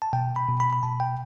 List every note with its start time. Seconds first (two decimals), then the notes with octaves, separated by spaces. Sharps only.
0.02 A5
0.13 B2 G5
0.36 B5
0.49 B2
0.60 B5
0.73 B5
0.83 B2 A5
1.00 G5